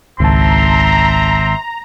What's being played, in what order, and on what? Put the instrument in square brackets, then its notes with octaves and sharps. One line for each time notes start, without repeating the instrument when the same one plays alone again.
[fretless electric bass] G#1 [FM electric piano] C#2 A5 [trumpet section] C4 E5 C6 [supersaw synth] A#5